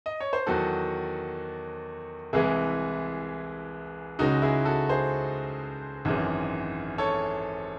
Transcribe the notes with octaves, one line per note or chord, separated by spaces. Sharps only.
D#5
C#5
C5
E2 D#3 F#3 F#4 A4
C2 C3 E3 G#3 E4 G#4
C#2 C#3 G#3 D#4 F#4
E4 G#4
F#4 A4
G#4 C5
G#1 F#2 E3 G#3
A4 C#5